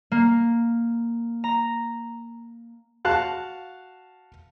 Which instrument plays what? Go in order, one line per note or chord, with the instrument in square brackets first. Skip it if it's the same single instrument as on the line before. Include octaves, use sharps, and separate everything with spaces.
[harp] A#3
A#5
[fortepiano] F#4 F5 A5 F#6